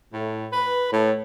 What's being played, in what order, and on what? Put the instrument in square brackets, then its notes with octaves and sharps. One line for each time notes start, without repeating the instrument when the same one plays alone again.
[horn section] A2
B4
A2